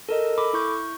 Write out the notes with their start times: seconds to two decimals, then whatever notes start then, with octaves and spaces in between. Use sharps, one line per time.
0.09 A4 A#4 D#5
0.38 A4 B5 D6
0.53 E4 C#6 G6